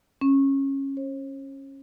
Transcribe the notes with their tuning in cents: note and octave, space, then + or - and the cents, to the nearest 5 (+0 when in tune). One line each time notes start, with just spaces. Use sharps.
C#4 -20
C5 +45